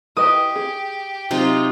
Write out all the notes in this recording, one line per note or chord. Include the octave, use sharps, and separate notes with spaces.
E4 G4 B4 D#5 D#6
G#4
C3 F#3 C4 D#4 F4 G4 A#5